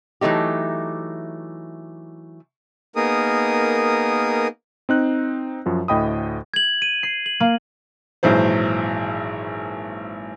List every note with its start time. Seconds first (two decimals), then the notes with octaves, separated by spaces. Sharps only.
0.21 E3 F#3 A3 D#4 G4
2.96 A#3 B3 D#4 G#4 A#4 D#6
4.89 C4 D#4 F#6
5.66 F#2 F3 F#4
5.88 D2 A2 D#5 G5 B5 D#6
6.54 G#6 F#7
6.82 D#7
7.03 C7
7.26 F#7
7.40 A#3
8.23 G#1 A#2 E3 F#3 C5